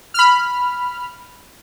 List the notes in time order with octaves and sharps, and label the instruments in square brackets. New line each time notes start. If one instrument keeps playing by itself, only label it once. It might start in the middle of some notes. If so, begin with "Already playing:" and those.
[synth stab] B5 F6